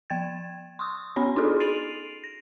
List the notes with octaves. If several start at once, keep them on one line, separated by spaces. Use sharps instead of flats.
F3 G5 G#6 A6
C6 C#6 D#6 E6
B3 C#4 C#5 B5
D4 D#4 F4 F#4 G#4 A4
A6 C7 D7 D#7 F7 F#7
A#6